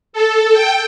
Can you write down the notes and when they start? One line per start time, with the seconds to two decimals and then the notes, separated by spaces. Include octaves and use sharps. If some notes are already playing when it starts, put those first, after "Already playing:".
0.13 A4
0.53 G5